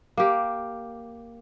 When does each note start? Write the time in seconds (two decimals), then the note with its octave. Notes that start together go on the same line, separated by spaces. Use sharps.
0.17 A#3 G4